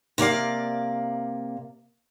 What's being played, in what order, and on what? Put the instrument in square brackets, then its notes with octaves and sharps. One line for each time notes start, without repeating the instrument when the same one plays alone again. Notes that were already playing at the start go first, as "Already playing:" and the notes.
[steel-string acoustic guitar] C3 A#3 D5 F5